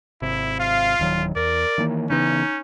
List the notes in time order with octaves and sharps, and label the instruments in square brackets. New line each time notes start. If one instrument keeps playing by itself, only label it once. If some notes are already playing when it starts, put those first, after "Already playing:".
[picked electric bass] G#1 C3 [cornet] E4
[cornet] F4 [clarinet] F5
[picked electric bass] D1 D#3 F#3
[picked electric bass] E2 [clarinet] A#4 [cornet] D5
[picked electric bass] D#3 E3 A#3
[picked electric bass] C#3 E3 B3 [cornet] C#4 [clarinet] D#4